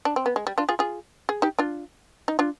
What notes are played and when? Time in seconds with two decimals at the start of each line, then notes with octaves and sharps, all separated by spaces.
0.05 D4
0.16 C4
0.26 B3
0.36 G#3
0.47 G3
0.58 D4 F4
0.69 F4 G#4
0.79 F4 G#4
1.29 G#4
1.42 D#4 G4
1.59 D4 F4
2.28 D#4
2.39 D4 F4